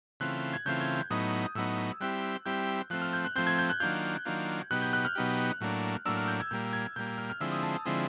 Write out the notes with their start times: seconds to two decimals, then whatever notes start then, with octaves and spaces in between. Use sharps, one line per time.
0.20 C#3 E3 A3 C4 F4 F#6
0.53 G#6
0.65 C#3 E3 A3 C4 F4 G6
0.81 G#6
0.96 G6
1.10 A2 F#3 B3 D#4 D#6
1.55 A2 F#3 B3 D#4 E6
2.00 G3 C4 E4 G4 F#6
2.46 G3 C4 E4 G4 G6
2.90 F3 A3 C4 F#6
3.02 F6
3.13 G6
3.25 F#6
3.35 F3 A3 C4 G6
3.47 G#6
3.59 G6
3.70 F#6
3.80 D#3 F#3 A#3 D4 F4 G6
4.26 D#3 F#3 A#3 D4 F4
4.71 B2 F#3 B3 D#4 G4 F#6
4.82 G6
4.93 F#6
5.05 F6
5.15 B2 F#3 B3 D#4 G4
5.61 A2 F#3 A#3 D4
6.05 A2 F#3 A#3 D4 E6
6.17 F6
6.28 G6
6.40 G#6
6.51 A#2 G3 A#3 G6
6.73 G#6
6.96 A#2 G3 A#3 G6
7.07 G6
7.18 F6
7.30 F6
7.40 D3 F3 G#3 C4 E4 E6
7.52 D#6
7.63 A5
7.85 D3 F3 G#3 C4 E4 D#6